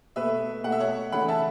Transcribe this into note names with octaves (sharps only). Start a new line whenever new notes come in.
B2 A3 B4 E5
B2 A3 F#5
E5
C#5 F#5
C#3 E3 A3 F#5 B5
E5 A5